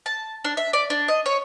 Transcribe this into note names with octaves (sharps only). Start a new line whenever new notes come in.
A5
D4
E5
D5
D4
D#5
C#5